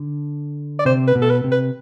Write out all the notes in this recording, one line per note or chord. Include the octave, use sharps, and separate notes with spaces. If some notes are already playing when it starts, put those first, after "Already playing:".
Already playing: D3
D5
C3 C5
B4
B2
A4
B4
C3
B4